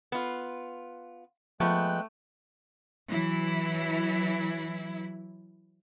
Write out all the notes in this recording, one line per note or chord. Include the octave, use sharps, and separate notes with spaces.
B3 F4
F3 G#3 A3 B3 G5 F#6
E3 F#3 E4